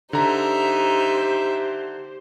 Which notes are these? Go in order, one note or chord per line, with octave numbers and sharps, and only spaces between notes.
D3 D#4 G4 C5 E5 A#5